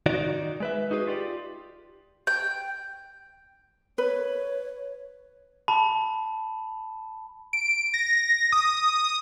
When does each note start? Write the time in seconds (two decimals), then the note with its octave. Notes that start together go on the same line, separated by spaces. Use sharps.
0.06 D#3 D#4 F#4 D5
0.60 G#3 B4 E5
0.91 D#4 F#4 G#4 B4
1.07 F4 G4 D5
2.27 G5
3.98 B4 C#5
5.68 A5 B5
7.53 D7
7.94 A#6
8.52 D#6